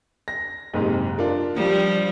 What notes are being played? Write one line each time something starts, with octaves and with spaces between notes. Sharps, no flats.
A#6
F#1 G#2 C3
D4 F4 A#4
F3 G3